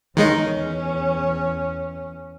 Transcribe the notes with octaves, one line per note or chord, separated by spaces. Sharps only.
E2 D#3 G#3 C#4 D#4